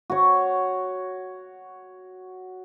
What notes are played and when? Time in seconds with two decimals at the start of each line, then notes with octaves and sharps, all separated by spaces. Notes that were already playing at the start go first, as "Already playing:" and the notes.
0.10 F#4 C#5